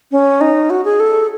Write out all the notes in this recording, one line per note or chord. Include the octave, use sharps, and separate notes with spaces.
C#4
D#4
F#4
G#4
A4